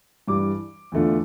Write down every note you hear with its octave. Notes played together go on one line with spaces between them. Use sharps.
G2 E3 G3 D6
E2 D3 A3 D4 F4